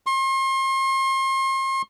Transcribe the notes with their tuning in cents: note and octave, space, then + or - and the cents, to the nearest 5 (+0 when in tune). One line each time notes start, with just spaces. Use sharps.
C6 +40